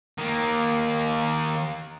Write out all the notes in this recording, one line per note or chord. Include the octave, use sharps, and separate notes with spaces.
D#3 A#3